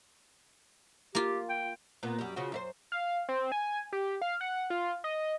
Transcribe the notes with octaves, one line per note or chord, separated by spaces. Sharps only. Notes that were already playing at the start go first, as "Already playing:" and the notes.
A#3 F4 G4
G5
A#2 B3
F#2 G3
C#3 F3 F#4
F#2 E4 C5
F5
C4
G#5
G4
F5
F#5
F4
D#5